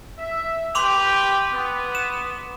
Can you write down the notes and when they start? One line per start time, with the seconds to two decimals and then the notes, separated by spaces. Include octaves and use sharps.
0.19 E5
0.75 G4 B4 G5 C6 D6 F7
1.53 B3
1.95 E7